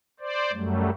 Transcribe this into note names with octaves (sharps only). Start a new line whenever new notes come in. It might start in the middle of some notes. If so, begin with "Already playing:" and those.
C5 D5
F#2 F#3 G3 A3